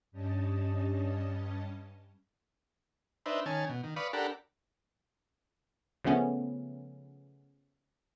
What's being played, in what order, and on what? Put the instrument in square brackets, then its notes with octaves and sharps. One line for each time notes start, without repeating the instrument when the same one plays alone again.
[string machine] G2 G3 C#4 D#5 A5
[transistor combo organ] D4 D#4 B4 C5 E5
D#3 C#4 G#5 A5
B2
D#3
B4 D5 F5 B5 C#6 D#6
D4 G4 A4 A#4 F#5 B5
[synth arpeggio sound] C#3 F3 A3 B3 C#4